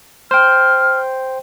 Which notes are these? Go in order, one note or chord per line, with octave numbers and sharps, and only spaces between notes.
C5 G5 F6